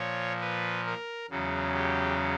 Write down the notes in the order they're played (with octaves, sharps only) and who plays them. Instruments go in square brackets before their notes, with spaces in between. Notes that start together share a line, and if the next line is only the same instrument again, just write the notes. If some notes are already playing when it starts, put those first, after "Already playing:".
Already playing: [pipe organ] A#2 F3 C#5
B4
A#4
E2 C#3 F#3
G4